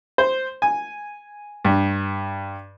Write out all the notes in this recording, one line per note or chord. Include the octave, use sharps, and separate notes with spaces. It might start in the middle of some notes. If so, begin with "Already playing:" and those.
C5
G#5
G2